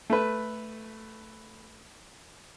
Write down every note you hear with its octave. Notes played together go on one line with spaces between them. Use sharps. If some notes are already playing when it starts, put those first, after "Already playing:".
A3 B4